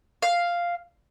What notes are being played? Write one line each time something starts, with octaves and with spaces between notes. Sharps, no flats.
F5